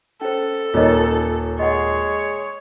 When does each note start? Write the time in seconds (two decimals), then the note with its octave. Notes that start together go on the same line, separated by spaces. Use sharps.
0.21 C#4 A4 C5
0.74 D#1 D#3 F4 C#5 D#5
1.59 G#3 C#5 D#5 F#5